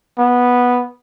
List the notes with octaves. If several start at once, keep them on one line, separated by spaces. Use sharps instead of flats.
B3